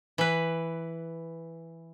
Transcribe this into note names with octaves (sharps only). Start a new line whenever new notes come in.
E3 B4